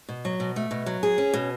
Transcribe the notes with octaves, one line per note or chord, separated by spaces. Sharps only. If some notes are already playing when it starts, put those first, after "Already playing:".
B2
F#3
B2
A3
B2
F#3
G#4
C#4
B2